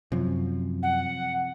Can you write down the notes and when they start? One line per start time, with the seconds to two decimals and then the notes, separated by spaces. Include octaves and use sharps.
0.12 F#2 C3 F3
0.83 F#5